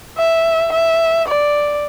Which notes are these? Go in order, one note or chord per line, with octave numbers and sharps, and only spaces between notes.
E5
E5
D5